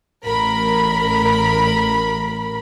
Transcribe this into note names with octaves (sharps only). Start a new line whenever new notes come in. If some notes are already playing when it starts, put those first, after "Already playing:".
A1 A#4 B5